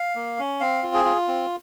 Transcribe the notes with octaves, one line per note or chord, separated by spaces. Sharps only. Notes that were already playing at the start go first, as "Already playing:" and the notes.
Already playing: F5
A#3
C#4
C4 F5
F4
G#4
F4
C4